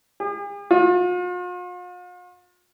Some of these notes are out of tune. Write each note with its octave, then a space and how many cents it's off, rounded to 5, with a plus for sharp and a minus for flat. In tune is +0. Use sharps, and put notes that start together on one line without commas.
G#4 -45
F4 +45